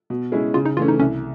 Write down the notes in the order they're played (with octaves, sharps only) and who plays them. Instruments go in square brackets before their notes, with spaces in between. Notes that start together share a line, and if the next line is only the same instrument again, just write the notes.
[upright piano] B2
G#3 C#4 E4 G#4
[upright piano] C#3 [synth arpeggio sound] F4
[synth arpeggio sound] D#4
[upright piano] E3 A3 C#4 [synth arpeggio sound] F4
[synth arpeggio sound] D#4
[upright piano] C2 [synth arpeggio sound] C#4